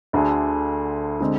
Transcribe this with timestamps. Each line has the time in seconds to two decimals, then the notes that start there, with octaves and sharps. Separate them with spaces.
0.13 D2 D3 A3 D4 G#4
1.20 D3 G#3 C4